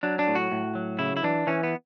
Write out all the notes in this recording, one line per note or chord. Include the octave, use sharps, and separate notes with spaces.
F#3 D4
D4
A2
F#4
A2
F#3
C#3 E4
E4
E3 D4
E3 C#4
B3